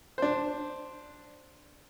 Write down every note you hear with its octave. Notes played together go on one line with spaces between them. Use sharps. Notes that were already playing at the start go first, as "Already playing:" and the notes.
D4 C5